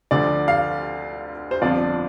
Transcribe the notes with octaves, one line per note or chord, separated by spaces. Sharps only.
D2 D3 F3 D5
F5
C5
G1 F2 F3 D4 F4 D5